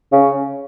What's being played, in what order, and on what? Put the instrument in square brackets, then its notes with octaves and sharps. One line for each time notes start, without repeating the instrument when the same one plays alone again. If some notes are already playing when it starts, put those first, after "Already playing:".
[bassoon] C#3